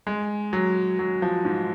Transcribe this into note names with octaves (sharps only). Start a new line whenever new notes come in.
G#3
F#3
F#3
F3
G#2